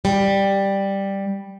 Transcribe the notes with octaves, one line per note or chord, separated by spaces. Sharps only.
G3